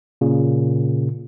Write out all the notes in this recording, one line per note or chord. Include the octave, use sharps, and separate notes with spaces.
A#2 C#3